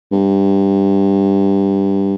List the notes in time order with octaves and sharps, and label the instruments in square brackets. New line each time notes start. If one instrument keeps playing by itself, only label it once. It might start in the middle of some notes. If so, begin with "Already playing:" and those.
[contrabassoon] G2